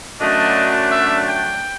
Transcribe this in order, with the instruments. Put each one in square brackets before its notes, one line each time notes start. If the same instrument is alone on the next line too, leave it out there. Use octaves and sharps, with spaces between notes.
[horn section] F#2 D3 F#3 A3 D4 D#5
E5
G5